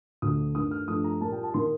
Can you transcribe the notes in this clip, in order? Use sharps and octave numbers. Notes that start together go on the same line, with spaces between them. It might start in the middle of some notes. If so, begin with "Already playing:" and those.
D2 D3 A3 D#6
G2 D#3 A3 D#6
F6
G2 F3 A3 D#6
A#5
A#2 G3 A#3 A5
G5
A5
D#3 A#3 C6